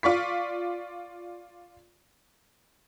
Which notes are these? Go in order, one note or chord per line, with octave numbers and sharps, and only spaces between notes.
F4 D5 C#6 B6